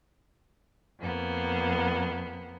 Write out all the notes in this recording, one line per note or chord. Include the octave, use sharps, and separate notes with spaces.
F2 A#3 B3